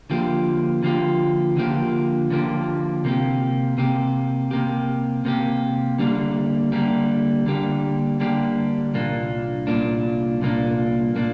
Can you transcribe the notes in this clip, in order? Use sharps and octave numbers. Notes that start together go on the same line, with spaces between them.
D3 F3 A#3 G4
D3 F3 A#3 G4
D3 F3 A#3 G4
D3 F3 A#3 G4
C3 A#3 G4
C3 A#3 G4
C3 A#3 G4
C3 A#3 G4
D3 G3 A#3 G4
D3 G3 A#3 G4
D3 G3 A#3 G4
D3 G3 A#3 G4
C2 A#2 A#3 D4
C2 A#2 A#3 D4
C2 A#2 A#3 D4
A#2 A#3 D4